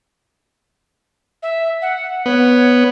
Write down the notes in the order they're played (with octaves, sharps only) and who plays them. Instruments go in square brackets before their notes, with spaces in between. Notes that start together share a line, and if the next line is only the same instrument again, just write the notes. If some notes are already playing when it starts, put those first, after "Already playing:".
[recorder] E5
F#5
[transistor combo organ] B3 [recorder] C#5